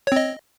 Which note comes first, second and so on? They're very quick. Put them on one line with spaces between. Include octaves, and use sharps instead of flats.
C#5 C4 D#5